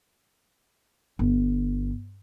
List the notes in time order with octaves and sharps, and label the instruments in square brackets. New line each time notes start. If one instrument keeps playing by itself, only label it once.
[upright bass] G1